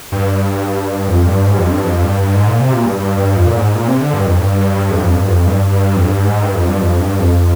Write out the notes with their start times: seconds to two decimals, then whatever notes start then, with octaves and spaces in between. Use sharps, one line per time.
0.12 G2
1.08 F2
1.26 G2
1.46 G#2
1.54 G2
1.58 F2
1.72 G2
1.84 F2
2.04 G2
2.22 G2
2.35 G#2
2.48 A#2
2.60 C3
2.73 A#2
2.86 G2
2.99 G2
3.17 G2
3.36 F2
3.47 A#2
3.56 G#2
3.75 A#2
3.88 C3
4.01 D3
4.13 G2
4.26 F2
4.39 G2
4.51 G2
4.71 G2
4.90 F2
4.96 G2
5.03 F2
5.15 G2
5.28 F2
5.46 G2
5.65 G2
5.96 F2
6.04 G2
6.24 G#2
6.43 G2
6.55 F2
6.68 G2
6.81 F2
7.00 G2
7.20 F2